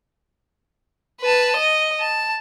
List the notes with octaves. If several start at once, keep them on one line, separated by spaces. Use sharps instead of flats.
B4 A5
D#5
A5